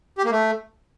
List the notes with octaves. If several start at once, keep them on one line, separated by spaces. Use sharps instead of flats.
G4
A#3
A3